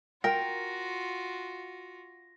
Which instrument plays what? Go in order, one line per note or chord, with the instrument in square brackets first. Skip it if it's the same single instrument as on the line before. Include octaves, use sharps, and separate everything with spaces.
[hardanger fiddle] F4 F#4 [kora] A#4 [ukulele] G5 [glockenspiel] A#6